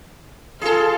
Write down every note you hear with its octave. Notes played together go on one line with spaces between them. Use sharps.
F4 G#4 A4